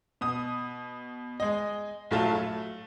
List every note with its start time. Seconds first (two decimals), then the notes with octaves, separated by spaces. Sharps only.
0.21 B2 D#6
1.40 G#3 D#5
2.11 A#1 A2 F#3 A3 F4 A5
2.35 A3